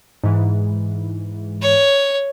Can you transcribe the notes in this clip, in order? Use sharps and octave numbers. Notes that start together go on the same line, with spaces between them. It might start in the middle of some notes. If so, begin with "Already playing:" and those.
G#2 E3
C#5